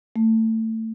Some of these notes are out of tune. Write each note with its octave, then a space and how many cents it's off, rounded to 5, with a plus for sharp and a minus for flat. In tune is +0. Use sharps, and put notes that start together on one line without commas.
A3 +25